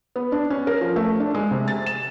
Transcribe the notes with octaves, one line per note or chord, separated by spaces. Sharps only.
B3
D4
C#4
A#4
F3
A3
D4
G#3
C3
A6
E7